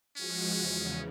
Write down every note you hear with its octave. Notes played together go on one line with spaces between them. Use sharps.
F3 G#3 C#4 F#4
E2 C#3